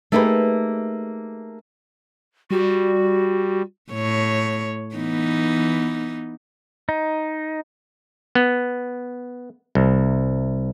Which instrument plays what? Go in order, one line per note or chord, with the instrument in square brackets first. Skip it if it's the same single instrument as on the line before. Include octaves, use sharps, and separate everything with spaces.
[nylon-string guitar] A3 A#3 D#4 G4 G#4 B4
[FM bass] G3 [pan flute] F#4
[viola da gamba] A2 C#5
E3 B3 D#4
[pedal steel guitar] D#4
[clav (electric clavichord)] B3
C2